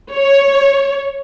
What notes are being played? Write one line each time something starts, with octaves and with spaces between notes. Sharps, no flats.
C#5